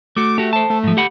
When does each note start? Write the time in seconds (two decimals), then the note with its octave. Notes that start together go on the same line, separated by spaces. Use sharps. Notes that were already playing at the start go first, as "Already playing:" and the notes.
0.16 A3 F#4 D6
0.38 A3 F#4 G4
0.53 C5 A5
0.70 A3
0.84 G#2 F3
0.97 G4 F#5 B5